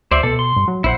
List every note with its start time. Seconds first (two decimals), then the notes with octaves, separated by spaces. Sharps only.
0.11 D2 C5 D5 E5
0.23 B2 A4
0.39 C6
0.56 G2
0.68 F#3
0.84 A#1 E4 C5 F#5